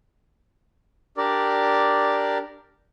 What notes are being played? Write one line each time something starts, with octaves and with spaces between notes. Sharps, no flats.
D4 G4 A#4 D5